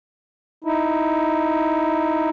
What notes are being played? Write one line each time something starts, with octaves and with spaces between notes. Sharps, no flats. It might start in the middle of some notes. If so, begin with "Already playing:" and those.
D#4 E4